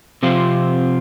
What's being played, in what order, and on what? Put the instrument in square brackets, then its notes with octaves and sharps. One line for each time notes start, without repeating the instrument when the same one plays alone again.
[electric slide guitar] C3 F3 C4 F4